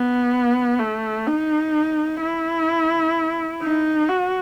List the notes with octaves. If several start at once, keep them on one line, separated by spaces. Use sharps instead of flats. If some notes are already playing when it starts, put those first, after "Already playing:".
Already playing: B3
A3
D#4
E4
D#4
F#4